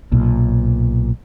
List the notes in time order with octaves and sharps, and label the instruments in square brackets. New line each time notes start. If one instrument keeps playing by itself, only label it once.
[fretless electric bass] B1 A#2